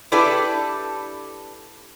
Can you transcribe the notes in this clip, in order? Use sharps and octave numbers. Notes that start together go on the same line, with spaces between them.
D4 E4 G4 A4 B4 D5